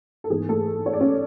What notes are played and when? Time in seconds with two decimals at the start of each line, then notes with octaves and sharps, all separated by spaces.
0.24 A4
0.30 G#2 E3 B3 G#4
0.49 A3 A4
0.86 C#5
0.93 D5
1.01 C#4 C#5